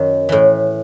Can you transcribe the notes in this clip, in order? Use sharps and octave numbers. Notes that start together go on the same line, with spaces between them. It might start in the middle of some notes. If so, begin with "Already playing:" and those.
Already playing: F#2 D#3
A2 E3